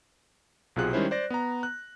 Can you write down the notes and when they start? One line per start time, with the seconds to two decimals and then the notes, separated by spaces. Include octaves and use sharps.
0.76 B1 C3 F4 F#4 G#4 F#6
0.93 D#3 G3 G#3 C#4 E4 C5
1.11 C5 D5 A#6
1.30 B3 A#5
1.63 F#6